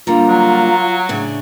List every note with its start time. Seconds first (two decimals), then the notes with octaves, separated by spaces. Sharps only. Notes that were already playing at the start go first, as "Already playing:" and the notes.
0.07 D3 G3 A#3 F4 A#5
0.29 F#3
1.09 A2 C#3 D4